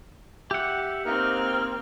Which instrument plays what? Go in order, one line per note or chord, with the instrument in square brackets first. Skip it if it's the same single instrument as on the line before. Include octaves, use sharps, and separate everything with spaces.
[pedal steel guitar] G4 F#5 [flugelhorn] E5
[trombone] A#3 [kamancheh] C4 F6 [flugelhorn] D#4